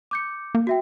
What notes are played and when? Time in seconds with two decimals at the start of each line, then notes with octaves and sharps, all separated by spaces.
0.11 D6 G6 C#7
0.55 A#3
0.67 F#4 E5 G5